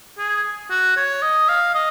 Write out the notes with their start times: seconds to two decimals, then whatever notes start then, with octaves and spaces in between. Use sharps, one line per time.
0.18 G#4
0.70 F#4
0.97 C#5
1.22 D#5
1.49 F5
1.74 D#5